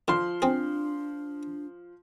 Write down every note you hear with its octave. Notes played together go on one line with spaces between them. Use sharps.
D3 F3 C6
C4 D4 G#4